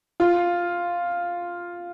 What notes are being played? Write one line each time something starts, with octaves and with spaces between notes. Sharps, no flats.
F4